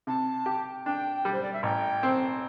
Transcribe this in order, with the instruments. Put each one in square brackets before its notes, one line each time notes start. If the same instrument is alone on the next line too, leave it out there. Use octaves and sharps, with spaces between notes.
[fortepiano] C3 [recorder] A5
[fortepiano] G4
[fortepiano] D4 [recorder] G5
[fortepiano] G3
[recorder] C5
D5
E5
[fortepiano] A1 [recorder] G5
[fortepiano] C4